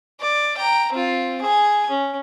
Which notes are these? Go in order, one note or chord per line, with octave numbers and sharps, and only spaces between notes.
D5
G5 A#5
C4 F4
G#4 G#5
C#4